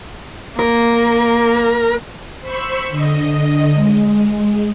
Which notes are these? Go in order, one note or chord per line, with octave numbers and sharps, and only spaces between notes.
A#3 A#4
C5 B5 C#6 E6
D3 D#5
G#3